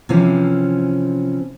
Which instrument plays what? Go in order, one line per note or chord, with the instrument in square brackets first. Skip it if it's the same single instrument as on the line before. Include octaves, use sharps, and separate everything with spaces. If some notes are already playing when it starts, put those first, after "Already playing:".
[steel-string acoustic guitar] C3 E3 F3 C4 C#4